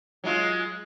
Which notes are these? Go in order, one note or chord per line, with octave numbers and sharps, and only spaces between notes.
F#3 G#3 F4